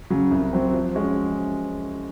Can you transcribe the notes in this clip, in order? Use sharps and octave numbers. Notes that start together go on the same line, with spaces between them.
C#3 F#3
C2
C3 F#3 C4
F3
G#3 C#4 F#4